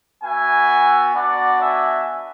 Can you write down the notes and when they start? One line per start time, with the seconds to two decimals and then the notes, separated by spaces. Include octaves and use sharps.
0.23 B3 F#4 E5 G#5
1.15 B3 D4 F#4 D5 F#5
1.61 E5 G#5